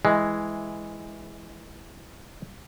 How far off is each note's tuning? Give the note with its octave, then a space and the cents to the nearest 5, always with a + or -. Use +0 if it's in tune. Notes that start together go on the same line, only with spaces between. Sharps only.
E3 +0 G#3 +0